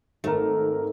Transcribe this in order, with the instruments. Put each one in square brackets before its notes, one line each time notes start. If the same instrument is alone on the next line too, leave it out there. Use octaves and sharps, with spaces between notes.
[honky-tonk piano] G#1 A#4 [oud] A3